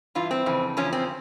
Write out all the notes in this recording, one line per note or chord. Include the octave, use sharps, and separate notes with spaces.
G2 E3 F4
C4
F2 C#3 E3
E2 C#3 F3 C#4
C4